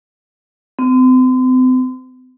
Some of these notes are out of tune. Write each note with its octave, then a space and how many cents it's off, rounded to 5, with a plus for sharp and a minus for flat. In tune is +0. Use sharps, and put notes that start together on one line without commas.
C4 -40